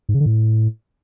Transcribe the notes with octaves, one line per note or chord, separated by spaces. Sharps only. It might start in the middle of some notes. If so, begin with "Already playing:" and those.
G#2
C#3
D3
A2